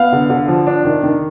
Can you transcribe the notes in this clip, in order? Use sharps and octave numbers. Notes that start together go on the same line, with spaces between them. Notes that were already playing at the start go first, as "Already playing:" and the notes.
Already playing: B3 F5
D3
D3
F3
D4
D#3
D#3